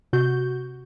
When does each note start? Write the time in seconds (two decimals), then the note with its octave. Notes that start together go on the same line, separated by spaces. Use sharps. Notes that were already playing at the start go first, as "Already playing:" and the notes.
0.13 C3 F#4 G6